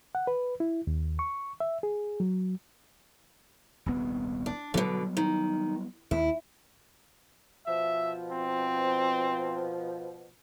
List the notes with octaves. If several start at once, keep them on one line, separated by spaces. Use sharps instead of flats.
F#5
B4
E4
D#2
C#6
E5
G#4
F#3
D#1 C2 B3
D4
B2 D3 F#3 G3 B3
D#3
D#2 E4
B2 F3 E5
C4